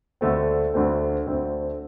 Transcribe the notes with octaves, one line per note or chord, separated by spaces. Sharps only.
D2 D3 A3 C4
D2 D3 A3 C4
D2 D3 A3 C4